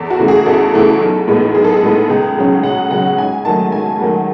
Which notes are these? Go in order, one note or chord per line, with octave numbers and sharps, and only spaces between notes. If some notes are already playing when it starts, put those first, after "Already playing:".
Already playing: E2 A4
F#4
C#3 E3 A3
G#4
E2 A4
C#3 E3 A3
B1
A2 G#3 B3
B1 G#4
A4
G#4
A2 G#3 B3
C#2 G#4
C#3 F#3 C#4
C#2 F#5
C#3 F#3 C#4 F#5
G#2 G#5
D#3 F#3 A3 A5
G#2 G#5
D#3 F#3 A3